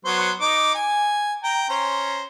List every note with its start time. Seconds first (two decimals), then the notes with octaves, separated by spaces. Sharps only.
0.05 F#3 B3 C5
0.41 D#4 D6
0.75 G#5
1.44 G5 A#5
1.69 C#4 C5 A#5